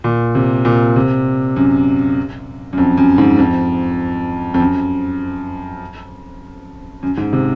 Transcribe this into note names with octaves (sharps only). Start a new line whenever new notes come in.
A#2
C3
A#2
C3
F#2
F#2
F2
F#2
G#2
F2
F2
F#2
F#2
G#2
C3